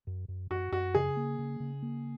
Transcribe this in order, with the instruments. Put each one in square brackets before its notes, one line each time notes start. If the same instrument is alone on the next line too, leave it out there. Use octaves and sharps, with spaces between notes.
[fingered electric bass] F#2
F#2
[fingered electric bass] F#2 [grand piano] F#4
[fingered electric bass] F#2 [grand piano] F#4
[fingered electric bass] C#3 [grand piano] G#4
[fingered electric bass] A#3
C#3
C#3
A#3